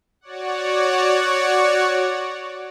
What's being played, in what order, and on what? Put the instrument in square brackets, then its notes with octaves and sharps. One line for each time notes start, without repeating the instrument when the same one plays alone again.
[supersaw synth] F#4 C#5 D5 F#5